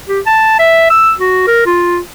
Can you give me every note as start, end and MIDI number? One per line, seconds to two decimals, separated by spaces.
0.09 0.20 67
0.26 0.56 81
0.59 0.88 76
0.90 1.12 88
1.19 1.46 66
1.47 1.63 70
1.66 1.98 65